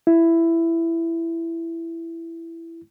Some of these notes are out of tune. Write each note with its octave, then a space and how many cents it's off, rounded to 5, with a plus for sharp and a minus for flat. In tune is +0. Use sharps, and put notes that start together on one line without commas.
E4 +10